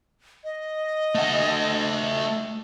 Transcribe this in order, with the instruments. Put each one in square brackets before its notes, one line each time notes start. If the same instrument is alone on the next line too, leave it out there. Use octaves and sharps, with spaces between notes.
[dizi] D#5
[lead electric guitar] A3 F#5